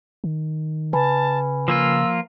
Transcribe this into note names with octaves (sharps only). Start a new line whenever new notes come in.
D#3
C#3 B4 G#5 A5 B5
F3 A#3 F4 E6